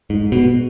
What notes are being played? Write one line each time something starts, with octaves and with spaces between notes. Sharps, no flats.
G#2
B2